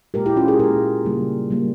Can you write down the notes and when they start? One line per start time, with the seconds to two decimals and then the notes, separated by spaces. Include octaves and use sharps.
0.14 A#2 G#3 G4 A#4
0.26 E4 G4
0.36 C#4 F4
0.48 F4 G#4
0.59 A#2 G#3 G4 A#4
1.05 C#3 G3 A#3
1.50 C#3 G3 A#3